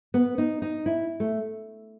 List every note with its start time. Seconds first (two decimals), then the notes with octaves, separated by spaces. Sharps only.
0.14 B3
0.38 D#4
0.62 D#4
0.86 E4
1.20 A3